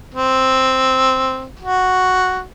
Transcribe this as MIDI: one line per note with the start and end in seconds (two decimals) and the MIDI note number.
0.14 1.48 60
1.59 2.44 66